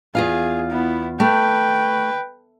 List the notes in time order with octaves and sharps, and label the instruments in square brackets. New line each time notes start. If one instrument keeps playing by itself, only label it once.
[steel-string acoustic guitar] E2 F4 F5 [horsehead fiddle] G#4
[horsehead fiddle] B3 E4
[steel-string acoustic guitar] A3 [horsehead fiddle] B4 G5